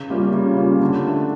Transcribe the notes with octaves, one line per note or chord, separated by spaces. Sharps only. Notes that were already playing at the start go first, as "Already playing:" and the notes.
Already playing: C#3
G3 A#3 C#4 F4
C#3
G3 A#3 C#4 F4
D3
A3 D4